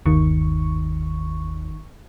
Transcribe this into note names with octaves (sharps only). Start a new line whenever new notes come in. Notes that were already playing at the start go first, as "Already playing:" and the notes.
G1 D#2 D#3 C#6